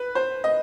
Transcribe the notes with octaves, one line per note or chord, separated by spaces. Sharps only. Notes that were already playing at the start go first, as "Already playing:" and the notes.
Already playing: B4
C5
D#5